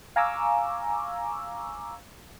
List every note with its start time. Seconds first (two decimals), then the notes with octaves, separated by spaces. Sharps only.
0.16 F5 G#5 A#5 C#6 D6 E6